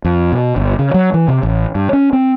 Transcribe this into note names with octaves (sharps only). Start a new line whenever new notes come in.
F2
B2
G1
C#3
F#3
E3
C3
A1
G2
C#4
C4